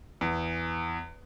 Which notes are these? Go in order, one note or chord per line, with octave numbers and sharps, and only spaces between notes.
E2